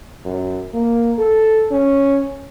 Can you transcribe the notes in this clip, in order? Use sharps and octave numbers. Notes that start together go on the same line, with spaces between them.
F#2
A#3
A4
C#4